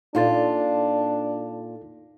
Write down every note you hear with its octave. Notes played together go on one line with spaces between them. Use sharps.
A#2 D4 D#4 F4 A4 A6